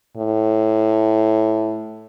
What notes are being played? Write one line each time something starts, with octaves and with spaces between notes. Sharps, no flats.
A2